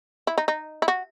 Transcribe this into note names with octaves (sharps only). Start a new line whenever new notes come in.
E4
D#4
D#4
E4
F#4